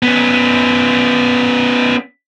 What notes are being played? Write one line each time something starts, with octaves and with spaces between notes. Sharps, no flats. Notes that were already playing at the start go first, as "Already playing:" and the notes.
B3 C#4